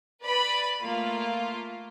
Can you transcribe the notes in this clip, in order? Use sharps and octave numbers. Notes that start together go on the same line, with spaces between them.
B4 D5 B5
A3 A#3 F4